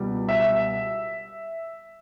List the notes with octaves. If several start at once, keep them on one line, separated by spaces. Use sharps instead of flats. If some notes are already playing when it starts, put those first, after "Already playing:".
Already playing: C#2 B2 G3 B3
E5